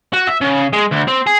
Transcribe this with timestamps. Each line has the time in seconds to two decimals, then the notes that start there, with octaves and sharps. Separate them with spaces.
0.14 F#4
0.28 E5
0.41 C#3
0.73 G#3
0.91 D2
1.08 C4
1.27 G#4